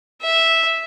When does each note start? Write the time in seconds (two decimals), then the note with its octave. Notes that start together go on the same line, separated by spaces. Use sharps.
0.22 E5